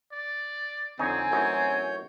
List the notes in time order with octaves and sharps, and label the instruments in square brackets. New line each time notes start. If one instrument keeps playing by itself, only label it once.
[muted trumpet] D5
[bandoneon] F2 D3 [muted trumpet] C4 [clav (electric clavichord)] D#4 C#5 [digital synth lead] G#5
[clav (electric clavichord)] A1 F#2 D#4 [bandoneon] C#5 G6